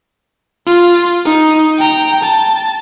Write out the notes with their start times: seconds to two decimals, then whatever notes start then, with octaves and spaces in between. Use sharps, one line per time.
0.67 F4
1.25 D#4
1.78 G5 A#5
2.23 A5